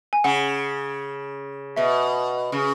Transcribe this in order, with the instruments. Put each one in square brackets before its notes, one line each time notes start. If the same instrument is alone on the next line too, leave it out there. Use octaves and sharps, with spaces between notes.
[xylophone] G#5
[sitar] C#3 [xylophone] F#5
[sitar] B2 [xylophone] E5
[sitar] C#3